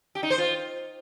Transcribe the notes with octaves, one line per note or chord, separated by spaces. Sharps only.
G4
D#4
C5
F4